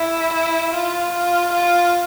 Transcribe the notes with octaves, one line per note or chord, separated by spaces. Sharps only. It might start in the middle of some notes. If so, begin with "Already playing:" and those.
Already playing: E4
E4
F4
F4
F4